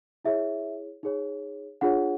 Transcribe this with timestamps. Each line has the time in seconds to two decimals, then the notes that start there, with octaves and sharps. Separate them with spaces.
0.25 E4 G#4 C#5 E5
1.03 D#4 G#4 C#5
1.81 D4 F4 G#4 C#5 F#5